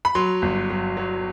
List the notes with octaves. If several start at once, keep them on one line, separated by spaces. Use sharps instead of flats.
B5
F#3 C6
G1
F#3
F#3